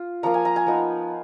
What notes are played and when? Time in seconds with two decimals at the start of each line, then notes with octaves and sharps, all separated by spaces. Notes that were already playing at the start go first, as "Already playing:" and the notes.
Already playing: F4
0.23 F3 A#3 F4 A#5
0.34 G#5
0.45 A#5
0.56 G#5
0.66 F3 B3 D#4